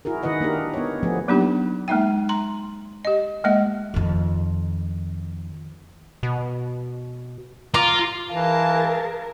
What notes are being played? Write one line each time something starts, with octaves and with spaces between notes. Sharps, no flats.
E4 F#4 G#4 A#4
D#3 E4 B4 D#5 F#5
A#3 D4 G4 A#4
B3 C#5
F3 A3 B3 G#4
F#3 A#3 B3 D4 D#4 G4
G#3 A#3 D#4 E5 G5
A#5 C6
G4 D#5
G#3 A#3 D#5 F#5
F2 D#3
B2
F4 A#5 D6
E3 G#4 A#4 F5 A5